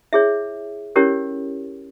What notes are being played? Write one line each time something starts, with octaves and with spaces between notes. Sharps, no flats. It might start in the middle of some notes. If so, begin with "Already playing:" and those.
E4 G#4 C#5 E5
C#4 E4 G4 A#4 C#5